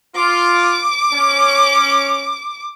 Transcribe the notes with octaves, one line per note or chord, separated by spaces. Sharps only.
F4 D6
C#4